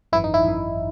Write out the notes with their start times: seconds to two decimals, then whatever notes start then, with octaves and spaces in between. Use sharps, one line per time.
0.12 G#1 F#2 E3 E4
0.24 D#4
0.34 E4
0.45 G#1 F#2 E3